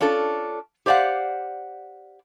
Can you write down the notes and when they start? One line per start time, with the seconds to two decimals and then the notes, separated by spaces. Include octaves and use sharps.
0.01 C#4 D4 F4 A4
0.86 G4 C5 D5 F5 F#5